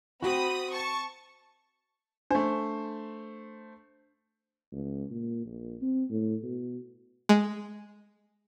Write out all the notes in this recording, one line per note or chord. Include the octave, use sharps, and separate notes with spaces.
C4 F#4 B5 D#6
A5 C#6
A3 D4 C5
C#2
A#2
A#1
C4
A2
B2
G#3